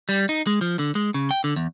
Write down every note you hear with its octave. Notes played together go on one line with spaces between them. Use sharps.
G3
D#4
G#3
F3
D3
G#3
C#3
G5
D3
E2